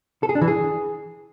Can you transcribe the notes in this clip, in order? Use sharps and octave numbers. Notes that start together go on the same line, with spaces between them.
A4
G#4
D4
E3
G#4